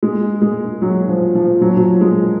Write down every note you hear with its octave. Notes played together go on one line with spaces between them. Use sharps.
G#3
G#3
F#3
F3
F3
F#3
F3
F#3
G#3